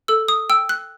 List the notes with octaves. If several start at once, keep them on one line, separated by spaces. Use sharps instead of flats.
A4 E6
D#6
G5 E6
F#6